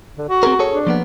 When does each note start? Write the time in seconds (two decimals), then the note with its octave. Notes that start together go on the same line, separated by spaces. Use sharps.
0.17 D3
0.29 F#4
0.43 C4 G#4 A#4
0.59 G#4 A4 C#5
0.73 D4
0.87 F3 A#3 B3